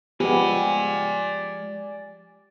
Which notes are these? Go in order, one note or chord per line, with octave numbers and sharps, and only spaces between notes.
F3 G#3 B3 G4 D5 G#5